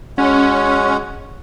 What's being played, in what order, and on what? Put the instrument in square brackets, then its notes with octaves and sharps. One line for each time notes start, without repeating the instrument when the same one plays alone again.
[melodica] G#3 F#4 F#5 [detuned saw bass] C#4